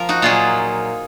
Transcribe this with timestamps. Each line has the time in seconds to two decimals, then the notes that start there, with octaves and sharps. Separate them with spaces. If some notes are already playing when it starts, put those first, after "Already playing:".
Already playing: F3 A#4
0.09 D#4 F#4
0.22 A#2 F#3 F4 G#4